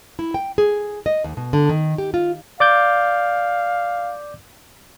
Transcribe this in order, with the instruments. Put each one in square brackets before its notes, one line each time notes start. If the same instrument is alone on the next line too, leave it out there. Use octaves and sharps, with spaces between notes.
[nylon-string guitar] E4
G5
G#4
D#5
D#2
B2
D3
D#3
G4
F4
[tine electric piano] D5 D6 G6 [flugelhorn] F5